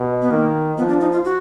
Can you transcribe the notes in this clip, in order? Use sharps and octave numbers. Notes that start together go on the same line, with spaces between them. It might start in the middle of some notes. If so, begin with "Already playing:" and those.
Already playing: B2
B3
D#3 A#3
F3 B3
D4
D#4
F4
F#4